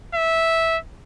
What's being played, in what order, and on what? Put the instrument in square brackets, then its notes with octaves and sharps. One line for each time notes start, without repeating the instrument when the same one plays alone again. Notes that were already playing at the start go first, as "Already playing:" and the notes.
[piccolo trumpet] E5